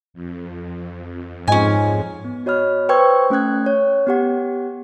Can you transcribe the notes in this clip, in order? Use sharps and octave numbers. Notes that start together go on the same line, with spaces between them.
F2
G#2 G#3 C#4 D#4 F4 G#5
B3
F#4 C#5 D#5 B5 F6
B4 C5 G5 C#6 E6 G#6
A3 C#4 G5 F#6 G#6
C#5
B3 G4 F#5